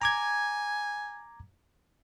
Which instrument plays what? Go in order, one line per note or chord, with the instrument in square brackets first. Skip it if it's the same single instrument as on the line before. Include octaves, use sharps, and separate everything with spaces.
[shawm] G#5 [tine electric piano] A#5 D6 G#6